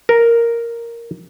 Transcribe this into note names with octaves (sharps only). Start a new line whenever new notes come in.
A#4